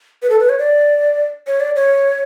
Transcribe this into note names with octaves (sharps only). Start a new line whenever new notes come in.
B4
A4
B4
C#5
D5
C#5
D5
C#5